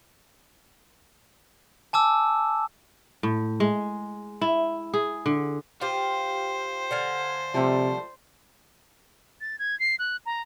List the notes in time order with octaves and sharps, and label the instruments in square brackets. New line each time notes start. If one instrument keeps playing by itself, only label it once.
[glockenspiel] G#5 A5 D6 E6
[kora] A2
G#3
E4
G#4
D3
[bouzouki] F4 G4 [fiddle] C5
[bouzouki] D3 F5 G#5
[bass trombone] C3 [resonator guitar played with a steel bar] F3 G3 A3
[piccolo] A6
G#6
C7
F#6
A#5